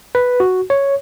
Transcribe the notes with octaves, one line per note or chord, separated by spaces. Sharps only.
B4
F#4
C#5